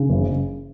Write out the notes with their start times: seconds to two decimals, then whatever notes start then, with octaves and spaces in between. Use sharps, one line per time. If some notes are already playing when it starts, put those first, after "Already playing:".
Already playing: C#3
0.09 F#1